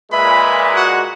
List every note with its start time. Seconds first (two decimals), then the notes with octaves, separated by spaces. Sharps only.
0.12 A#2 G#3 B4 E5 B5
0.76 F#4 F#5